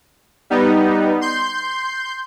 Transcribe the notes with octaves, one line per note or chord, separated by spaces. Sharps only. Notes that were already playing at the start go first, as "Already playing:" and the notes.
G3 B3 D#4
C6 G6